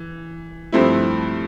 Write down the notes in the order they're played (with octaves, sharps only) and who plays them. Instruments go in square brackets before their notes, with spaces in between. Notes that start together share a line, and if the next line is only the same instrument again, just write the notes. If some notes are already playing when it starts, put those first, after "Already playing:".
Already playing: [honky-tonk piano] E3
G2 F3 A3 C4 E4